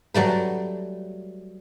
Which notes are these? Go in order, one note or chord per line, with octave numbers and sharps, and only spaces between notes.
F#3 G3 A3 B4